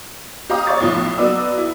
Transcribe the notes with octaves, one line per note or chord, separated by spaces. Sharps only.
G4 D#5 F5 A#5 D6 D#6
C#5 C#6 A6
B1 A2 F3
F#3 B3 D5 D6 E6
E4